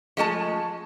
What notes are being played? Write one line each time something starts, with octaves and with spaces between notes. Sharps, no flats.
F3 G#3 A3 A5